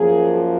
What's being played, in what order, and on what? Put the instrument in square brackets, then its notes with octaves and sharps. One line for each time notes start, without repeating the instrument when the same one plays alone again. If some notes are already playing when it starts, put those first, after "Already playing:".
Already playing: [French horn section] F#2 F3 A#3 G#4